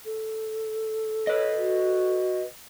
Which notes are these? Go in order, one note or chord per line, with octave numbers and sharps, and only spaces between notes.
A4
B4 C#5 D#5
F#4